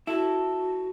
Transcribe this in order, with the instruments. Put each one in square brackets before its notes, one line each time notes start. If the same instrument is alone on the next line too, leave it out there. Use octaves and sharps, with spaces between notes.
[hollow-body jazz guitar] E4 [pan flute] F#4 [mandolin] A4